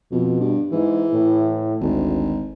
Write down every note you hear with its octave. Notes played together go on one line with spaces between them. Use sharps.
F2 B2
G2
G#2 E3
A2
G#1 D2